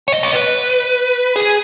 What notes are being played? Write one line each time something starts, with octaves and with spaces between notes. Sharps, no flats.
C#5
D#5
C#5
B4
G#4